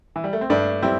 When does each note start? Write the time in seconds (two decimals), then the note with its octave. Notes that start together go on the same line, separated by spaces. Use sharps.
0.16 E3
0.24 G3
0.33 A3
0.41 C4
0.50 G2 A3 D4
0.82 G3 C4 E4